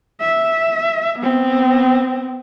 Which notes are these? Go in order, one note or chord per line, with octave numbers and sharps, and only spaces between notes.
E5
B3 C4